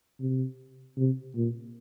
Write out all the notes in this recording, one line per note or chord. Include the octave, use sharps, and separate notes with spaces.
C3
C3
A#2